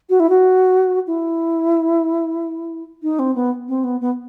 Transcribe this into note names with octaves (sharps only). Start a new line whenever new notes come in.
F#4
E4
F#4
E4
D#4
C4
B3
C4
B3
B3